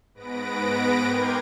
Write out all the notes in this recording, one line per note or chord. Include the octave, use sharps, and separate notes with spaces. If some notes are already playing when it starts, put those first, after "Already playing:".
G#2 B3 B4 A#6 D7
A#4 G5 C6 D6 G#6